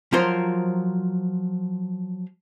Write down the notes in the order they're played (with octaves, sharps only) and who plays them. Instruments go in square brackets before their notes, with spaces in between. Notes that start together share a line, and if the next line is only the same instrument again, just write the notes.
[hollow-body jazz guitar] F3 F#3 F4 A#4 C5